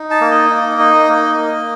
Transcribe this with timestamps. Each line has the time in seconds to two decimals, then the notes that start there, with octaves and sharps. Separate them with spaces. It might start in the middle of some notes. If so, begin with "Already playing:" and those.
Already playing: D#4
0.11 A5
0.21 A#3
0.31 D#5
0.50 D#4
0.79 D#4
1.09 A#3
1.37 A#3